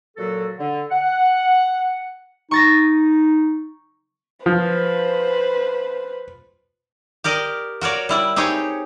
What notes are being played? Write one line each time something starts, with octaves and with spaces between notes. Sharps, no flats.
A#2 F#3 F#4 A4
D3
F#5
D#4 C#6 A6 A#6
F3 B4 C5
G4 A#4 D5 D#5
F#4 A#4 C#5 D5
G3 E4 D5
C4 D#4 G4 G#4 C#5